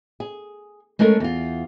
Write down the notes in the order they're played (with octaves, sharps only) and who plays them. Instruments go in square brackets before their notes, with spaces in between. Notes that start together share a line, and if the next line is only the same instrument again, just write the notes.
[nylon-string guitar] G#4
G#3 A3 C#4 A4 A#4
E2 F4